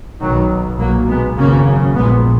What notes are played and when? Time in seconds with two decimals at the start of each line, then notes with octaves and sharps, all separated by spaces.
0.20 B1 B2 D#3 F#3
0.79 B1 A#2 F#3 A#3
1.08 G#3 B3
1.37 G#1 F#2 C#3 A#3 C#4
1.95 A#1 A#2 G#3 B3